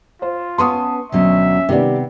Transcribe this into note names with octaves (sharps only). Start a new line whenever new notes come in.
F4 C5
B3 C#4 B4 A5 C6 C#6 D#6
D2 B2 F#3 C#4 E5
C3 D#3 G3 B3 D5